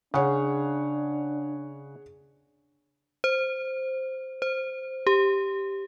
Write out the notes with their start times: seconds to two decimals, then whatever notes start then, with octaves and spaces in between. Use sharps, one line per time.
0.14 C#3 D4 G#4 C#5 F#5
3.24 C5
4.42 C5
5.07 G4